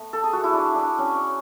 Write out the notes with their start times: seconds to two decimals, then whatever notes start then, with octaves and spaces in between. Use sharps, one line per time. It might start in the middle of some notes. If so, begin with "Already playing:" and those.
Already playing: A3 B3
0.13 A4
0.24 G#4
0.33 F#4
0.44 E4
0.53 D4
0.75 D4
0.98 C#4